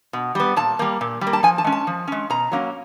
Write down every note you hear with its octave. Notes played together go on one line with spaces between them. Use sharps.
B2
G3 B3
A#2 A5
G3 A#3
A#2
G3
A#3
A5
F3 G#5
A5
G#3 C#4
A5
F3
G#3 C#4
B2 A#5
F#3 A#3 C#4